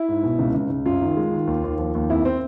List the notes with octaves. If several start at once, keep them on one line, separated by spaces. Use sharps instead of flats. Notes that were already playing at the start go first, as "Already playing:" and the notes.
Already playing: E4
G#2
B2
C#2
C#2
C#2
F#2 F4
D#3
G#3
D#3
D#2
D#2
F3
D#2
F2 E4
C4